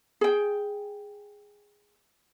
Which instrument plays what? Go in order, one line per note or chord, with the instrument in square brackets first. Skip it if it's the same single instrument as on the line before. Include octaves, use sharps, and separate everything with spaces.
[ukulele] G#4 G5